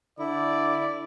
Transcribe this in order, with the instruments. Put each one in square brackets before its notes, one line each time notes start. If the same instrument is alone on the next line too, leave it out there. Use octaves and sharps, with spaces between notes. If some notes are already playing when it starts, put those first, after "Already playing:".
[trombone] D3 [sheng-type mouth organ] E4 [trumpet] D5